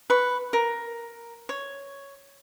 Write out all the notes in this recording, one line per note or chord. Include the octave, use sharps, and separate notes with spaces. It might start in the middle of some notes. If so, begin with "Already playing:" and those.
B4 C#6
A#4
C#5